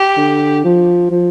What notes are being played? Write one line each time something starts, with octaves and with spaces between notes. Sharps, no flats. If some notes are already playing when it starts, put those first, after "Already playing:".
Already playing: G4
D3
F3
F3